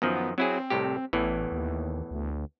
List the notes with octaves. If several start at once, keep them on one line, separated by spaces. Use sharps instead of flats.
F#2 D#3 F3 B3
F#3 C4 E4 G#4
C2 A2 G4
A1 E2 A2 E3
D#2
D2